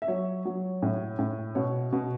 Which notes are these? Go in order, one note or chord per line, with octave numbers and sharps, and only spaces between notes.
E5
F#3 C#5
F#3
A2
A2
B2 C#5
B2